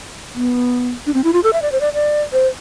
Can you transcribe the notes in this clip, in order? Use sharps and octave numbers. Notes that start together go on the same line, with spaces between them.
B3
D4
C4
E4
F4
A4
E5
D5
C5
D5
D5
C5